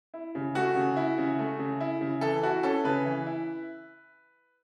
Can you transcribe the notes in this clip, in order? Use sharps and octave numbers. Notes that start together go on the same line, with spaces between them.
E4
C#3
A3 F#4
C#3
E4
C#3
A3
C#3
E4
C#3
E3 A4
E4 F#4
C#4 A4
C#3 B4
E3
E4